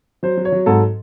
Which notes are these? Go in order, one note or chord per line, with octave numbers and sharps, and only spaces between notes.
F#3 C5
F#3
C#5
F#3
G#2 A4